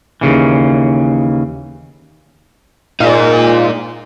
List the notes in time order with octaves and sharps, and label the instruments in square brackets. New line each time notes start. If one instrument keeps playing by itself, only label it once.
[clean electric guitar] D#2 C#3 E3
[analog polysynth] A#2 [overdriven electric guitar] D#4 G#4